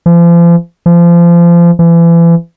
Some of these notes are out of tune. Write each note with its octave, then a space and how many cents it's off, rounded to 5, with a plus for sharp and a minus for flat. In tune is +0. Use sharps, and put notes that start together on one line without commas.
F3 -40
F3 -30
E3 +35